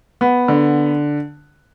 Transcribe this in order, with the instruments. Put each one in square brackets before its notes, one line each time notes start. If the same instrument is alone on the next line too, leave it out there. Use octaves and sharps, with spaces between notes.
[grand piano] B3
D3